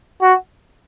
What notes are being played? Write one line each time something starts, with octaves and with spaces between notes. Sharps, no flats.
F#4